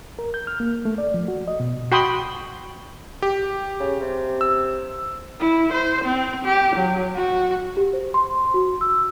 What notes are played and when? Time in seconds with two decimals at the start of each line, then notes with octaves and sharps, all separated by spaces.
0.19 A#4
0.34 G6
0.47 F6
0.60 A#3
0.85 A3
0.98 D5
1.14 F3
1.28 F#4
1.48 D#5
1.60 B2
1.92 F#4 G5 B5 C6 D#6
3.22 G4
3.80 C#3
4.01 C3
4.41 E6
5.40 E4
5.73 C5
6.04 C4
6.45 G4
6.75 F#3
7.15 F#4
7.77 G4
7.93 C5
8.14 C6
8.54 F#4
8.81 E6